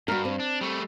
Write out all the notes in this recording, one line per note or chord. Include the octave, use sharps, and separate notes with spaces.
G2 F#4 A#4
C4
D4
G3 A3